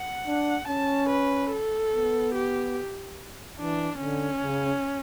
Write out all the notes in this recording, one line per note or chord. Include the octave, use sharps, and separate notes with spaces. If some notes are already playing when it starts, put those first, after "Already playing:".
Already playing: F#5
D4
C#4 A5
B4
A4
B3
G4
E3 D4
D3 C#4
C#3